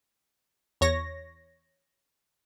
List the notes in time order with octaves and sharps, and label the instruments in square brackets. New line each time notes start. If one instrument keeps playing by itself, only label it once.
[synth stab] E2 C#5 A#6